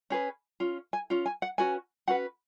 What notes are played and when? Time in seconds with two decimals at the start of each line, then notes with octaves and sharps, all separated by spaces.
0.10 C#4 G#4 B4
0.60 C#4 F4
0.93 G#5
1.10 C#4 F4
1.26 G#5
1.42 F#5
1.58 C#4 F#4 B4 G#5
2.08 C#4 F#4 B4 F#5